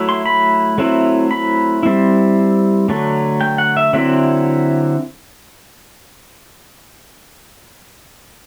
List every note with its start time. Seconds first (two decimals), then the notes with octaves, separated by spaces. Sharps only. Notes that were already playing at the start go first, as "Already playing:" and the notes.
Already playing: F#3 A3 E4
0.09 C6
0.26 B5
0.78 F#3 A3 C4 E4
1.31 B5
1.83 G3 C4 E4
2.89 D3 F#3 A3
3.41 G5
3.58 F#5
3.77 E5
3.93 D3 F#3 C4 E4 E5